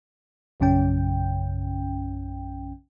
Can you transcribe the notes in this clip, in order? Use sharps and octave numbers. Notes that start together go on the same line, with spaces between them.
A#1 F#2 C#3 C#4 G5